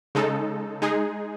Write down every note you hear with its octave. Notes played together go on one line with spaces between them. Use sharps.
C#3 G#3 D#4 A4
G#3 D#4 G#4